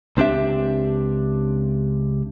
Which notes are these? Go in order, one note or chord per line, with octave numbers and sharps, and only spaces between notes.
C#2 C4 D4 G4 E5